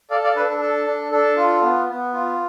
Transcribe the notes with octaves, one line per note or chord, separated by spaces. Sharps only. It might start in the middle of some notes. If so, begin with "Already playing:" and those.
A4 D5 F5
D5 F5
D4 B4
A4
A4
D4
D4 A4
F4
B3
B3
F4